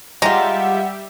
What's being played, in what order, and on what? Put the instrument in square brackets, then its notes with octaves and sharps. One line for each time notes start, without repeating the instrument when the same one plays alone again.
[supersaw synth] G3 G4 E5 [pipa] G#3 F4 [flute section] F#5 [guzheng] A#5